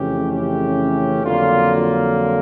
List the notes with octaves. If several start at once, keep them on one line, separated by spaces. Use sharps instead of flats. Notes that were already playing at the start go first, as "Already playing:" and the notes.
Already playing: F2 C#3 E3 A3 C#4 G4
G4
F2 D3 F#3 A#3 F4